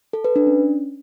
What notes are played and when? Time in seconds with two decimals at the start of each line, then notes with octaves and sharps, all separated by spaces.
0.13 A4
0.24 B4
0.36 D4
0.47 C#4